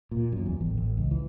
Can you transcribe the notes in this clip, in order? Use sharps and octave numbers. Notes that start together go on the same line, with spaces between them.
A#2
F#2
E2
A1
A1
C#2
E3